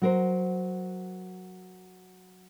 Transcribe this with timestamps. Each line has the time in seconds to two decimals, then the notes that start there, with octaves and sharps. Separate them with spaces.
0.02 F#3 A#4 C5